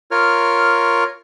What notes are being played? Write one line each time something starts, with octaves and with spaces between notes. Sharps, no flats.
F4 A#4 C#5 F6